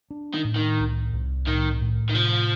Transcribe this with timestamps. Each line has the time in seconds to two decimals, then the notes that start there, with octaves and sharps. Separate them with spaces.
0.11 D4
0.34 D#3
0.44 A2
0.56 D#3
0.79 C2
1.13 C2
1.47 A2 D#3
1.81 A2
2.09 D#3
2.15 C3 F3